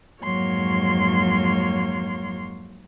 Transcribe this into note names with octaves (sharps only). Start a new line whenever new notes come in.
F2 G#2 F#3 A#3 C#5 C6